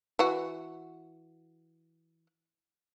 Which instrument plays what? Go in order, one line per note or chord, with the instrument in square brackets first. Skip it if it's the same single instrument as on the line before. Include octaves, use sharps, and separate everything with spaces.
[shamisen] E3 F#4